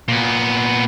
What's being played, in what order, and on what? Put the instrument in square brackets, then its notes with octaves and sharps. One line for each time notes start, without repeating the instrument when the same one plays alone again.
[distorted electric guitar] A#2 B3